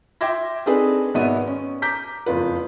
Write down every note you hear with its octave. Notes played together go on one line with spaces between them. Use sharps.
E5 G5 C6 D6 G#6 A#6
C4 D4 D#4 G#4 A4 B4
G#1 B2 B3 E5 D#7
C#4
A#5 D6 G6 B6
F#1 F2 F4 B4